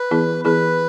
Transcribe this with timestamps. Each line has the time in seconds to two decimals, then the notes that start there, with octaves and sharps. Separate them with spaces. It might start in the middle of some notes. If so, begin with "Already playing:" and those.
Already playing: B4
0.11 E3 B3 E4 G#4
0.45 E3 B3 E4 G#4 B4